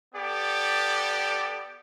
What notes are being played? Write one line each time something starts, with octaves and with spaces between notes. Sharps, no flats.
B3 G4 A4 D5